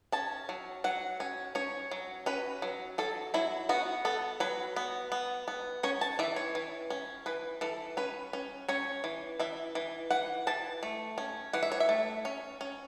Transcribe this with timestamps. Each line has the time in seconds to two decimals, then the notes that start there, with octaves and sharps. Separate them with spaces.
0.12 C#4 A5
0.49 F#3
0.84 F#3 F#5
1.20 C#4
1.55 C#4 C#5
1.91 F#3
2.26 C#4 B4
2.62 F#3
2.98 F#3 A4
3.34 F#3 E4
3.69 B3 F#4
4.05 B3 A4
4.40 F#3 B4
4.76 B3
5.12 B3
5.48 B3
5.83 C#4 C#5
6.01 A5
6.19 E3 E5
6.36 C#5
6.55 E3
6.90 C#4
7.26 E3 B4
7.61 E3 A4
7.97 C#4 B4
8.33 C#4
8.69 C#4 C#5
9.04 E3
9.40 E3 E5
9.75 E3
10.11 E3 F#5
10.47 E3 A5
10.83 A3
11.18 C#4
11.53 E3 F#5
11.63 E5
11.72 C#5
11.80 E5
11.89 A3
12.25 C#4
12.61 C#4